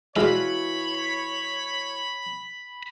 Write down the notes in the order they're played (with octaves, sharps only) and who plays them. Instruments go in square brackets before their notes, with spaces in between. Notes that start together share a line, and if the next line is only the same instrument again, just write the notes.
[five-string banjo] E3 F4 F#4 [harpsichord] G#3 D4 [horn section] C#5 [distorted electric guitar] B5